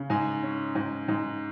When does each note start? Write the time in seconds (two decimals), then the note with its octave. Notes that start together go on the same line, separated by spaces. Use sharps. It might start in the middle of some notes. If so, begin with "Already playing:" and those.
Already playing: C#3
0.10 G#2 G#5
0.43 C#4
0.76 G#2
1.08 G#2